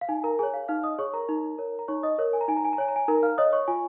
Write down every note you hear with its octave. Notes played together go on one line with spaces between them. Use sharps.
F5
D#4 G#5
A#4 A#5
G#4 C#5 G#5
F5
D#4 F5 F6
D#5 D#6
G#4 C#5 C#6
A#4 A#5
D#4
A#4 C#5
A#5
D#4 C#5 C#6
D#5 D#6
A#4 C#5
G#5
A#5
D#4 G#5
A#5
G#5
A#5
C#5 G#5
A#5
G#5
D#4 A#4 A#5
F5 F6
C#5 D#5 D#6
C#5 C#6
F4 G#5